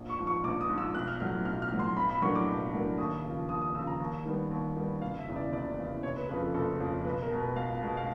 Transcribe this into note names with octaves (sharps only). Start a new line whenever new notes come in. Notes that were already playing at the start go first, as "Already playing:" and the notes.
Already playing: A#1
C#6
G#2 F3
C#6
A#1 D6
D#6
G#2 F3
E6
B1 F#6
F6
A2 F#3 F6
B1 F6
F6
A2 F#3
C6
B1 B5
B5
A2 F#3 A#3 D4 C#6
D6
B1
A2 F#3 A#3 D4
D#2 D#6
C#3 F3
D#2 D#6
D#6
C#3 F3 E6
A#5
D#2
D#3 G3 B3
D#2
D#3 G3 B3
F#1 F5
E5
E2 C#3 E3
D5
F#1 D5
E2 C#3 E3
F#1 C#5
B4
F2 C#3 F3 B4
A4
F#1 A4
F2 C#3 F3
B1 B4
A#4
B2 G#3
B4
B1 F5
B2 G#3
F5